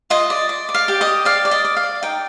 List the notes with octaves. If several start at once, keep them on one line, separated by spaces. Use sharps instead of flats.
F4 D#5
D5
D5
D5
F5
G4
D#5
G4
D5 F5
D5
D#5
D5
F5
D5
D#4 G5